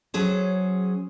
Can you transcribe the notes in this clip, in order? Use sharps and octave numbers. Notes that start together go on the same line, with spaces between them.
F#3 C#4 G#4 C5